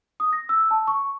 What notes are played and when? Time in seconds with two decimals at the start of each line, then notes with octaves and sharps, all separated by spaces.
0.20 D#6
0.33 A#6
0.49 E6
0.71 A5
0.87 C#6